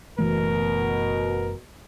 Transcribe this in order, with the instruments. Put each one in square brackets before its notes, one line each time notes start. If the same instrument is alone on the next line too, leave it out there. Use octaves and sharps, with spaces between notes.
[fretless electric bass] F#1 E3 A3 [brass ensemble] B2 [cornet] A#4